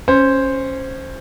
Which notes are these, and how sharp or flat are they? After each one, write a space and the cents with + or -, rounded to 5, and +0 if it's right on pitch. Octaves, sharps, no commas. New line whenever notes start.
C#4 -15 C5 +0